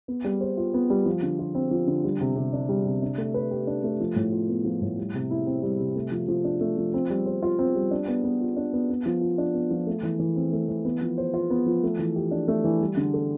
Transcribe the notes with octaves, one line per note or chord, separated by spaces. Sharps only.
B3
G3
C5
F4
B3
G3
F3
D3
F4
C4
F3
D3
G3
C3
C3
D4
G3
C3
D4
A3
B4
G4
D4
A3
F3
A2
F4
B3
F3
A2
G3
C3
E4
C4
G3
C3
A3
F3
F3
D4
A3
F3
C4
G3
C5
F4
C4
G3
D4
B3
B3
F4
D4
B3
B3
F3
F4
D4
B3
F3
A3
E3
E3
C4
A3
E3
B3
F3
C5
F4
B3
F3
A3
E3
G4
D4
A3
E3
G3
D3
A4